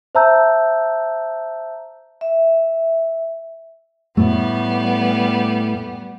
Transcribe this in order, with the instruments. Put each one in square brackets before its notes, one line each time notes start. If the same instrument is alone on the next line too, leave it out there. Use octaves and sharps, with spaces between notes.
[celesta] C5 E5 A5 A#5 E6 G6
[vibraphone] E5
[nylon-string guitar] A2 A3 [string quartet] G3 B3